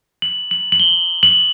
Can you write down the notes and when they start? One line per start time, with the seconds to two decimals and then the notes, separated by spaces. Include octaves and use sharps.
0.22 F#7
0.51 F#7
0.72 F#7
0.80 G7
1.23 F#7